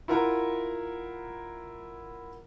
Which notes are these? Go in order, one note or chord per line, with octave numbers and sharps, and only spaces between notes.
E4 F4 A#4 F#5 A#5